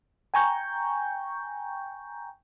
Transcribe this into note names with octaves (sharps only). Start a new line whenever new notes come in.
G5 G#5 A#5 C#6 G6